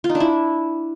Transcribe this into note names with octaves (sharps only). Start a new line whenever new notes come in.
F4
D#4
D4
E4